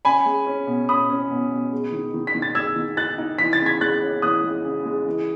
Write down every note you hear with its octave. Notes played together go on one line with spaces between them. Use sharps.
C#4 G#5 B5
G#3
C#4
B2
C#4 B5 D#6
C#4
B2
B2
G#3
D#3
D#3
B6
D#3
A6
G#3 E6 G#6
D#3
D#4 F#6 A6
D#4
E3 B6
A6
C#3
G#6 B6
G#3 F#6 A6
C#4
E3 D#6 F#6
G#3
C#3
G#3
E3